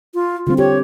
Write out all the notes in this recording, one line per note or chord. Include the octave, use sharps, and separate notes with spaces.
F4
D3 G3 C4 F4
G4 C#5